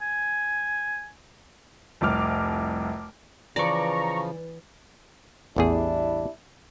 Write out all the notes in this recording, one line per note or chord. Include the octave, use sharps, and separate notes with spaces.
G#5
F1 C2 D6 F6
C#3 E3 F3 D5 A#5 C#6
A1 E2 G3 D4 E4 G#4